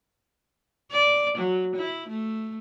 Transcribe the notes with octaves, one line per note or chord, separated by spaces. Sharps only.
D5
F#3
E4
A3